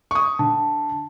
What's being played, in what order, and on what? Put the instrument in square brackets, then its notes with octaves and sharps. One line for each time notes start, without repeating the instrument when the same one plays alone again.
[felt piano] C#6 D#6
[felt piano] D3 [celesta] A5